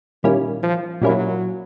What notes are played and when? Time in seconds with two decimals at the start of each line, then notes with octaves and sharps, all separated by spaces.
0.23 A#2 D#3 G3 A#3 C#4 E4
0.63 F3
1.02 A#2 F#3 G3 A#3 C#4 E4